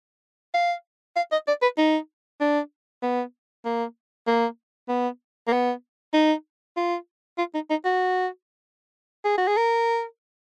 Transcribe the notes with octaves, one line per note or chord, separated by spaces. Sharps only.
F5
F5
D#5
D5
B4
D#4
D4
B3
A#3
A#3
B3
A#3
B3
D#4
F4
F4
D#4
D#4
F#4
G#4
F#4
G#4
A#4